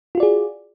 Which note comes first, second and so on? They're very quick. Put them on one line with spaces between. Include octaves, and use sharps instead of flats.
F4 F#4 D5 G#4